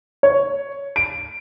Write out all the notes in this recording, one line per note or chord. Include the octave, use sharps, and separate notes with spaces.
C#5
D7